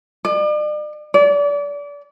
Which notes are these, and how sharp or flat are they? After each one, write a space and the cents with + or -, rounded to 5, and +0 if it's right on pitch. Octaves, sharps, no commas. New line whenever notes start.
D5 +40
D5 -30